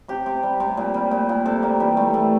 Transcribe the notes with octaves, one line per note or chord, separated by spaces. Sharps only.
C3 G4
C3
G3
C3
A#2
G3
A#2
A#2
C3 A4
G3 A#3
E3 G3
C3 A3
G3 A3